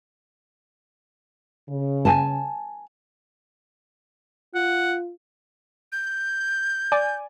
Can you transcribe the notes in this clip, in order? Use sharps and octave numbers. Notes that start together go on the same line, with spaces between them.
C#3
G#5 A5
F4 F#5
G6
D5 G#5